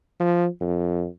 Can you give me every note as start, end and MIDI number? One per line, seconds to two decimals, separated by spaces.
0.20 0.47 53
0.61 1.06 41